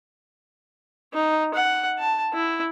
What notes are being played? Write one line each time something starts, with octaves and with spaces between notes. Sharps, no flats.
D#4
F#5
A5
E4